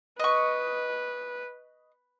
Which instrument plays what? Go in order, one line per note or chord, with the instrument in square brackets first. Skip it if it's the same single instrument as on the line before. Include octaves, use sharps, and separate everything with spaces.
[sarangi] B4 [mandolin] D#5 C#6